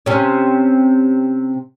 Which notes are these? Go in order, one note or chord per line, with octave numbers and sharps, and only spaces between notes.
C3 C#4